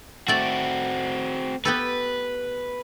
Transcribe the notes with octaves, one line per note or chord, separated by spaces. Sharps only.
A3 C4 F#4 D5
B3 G4 A4 B4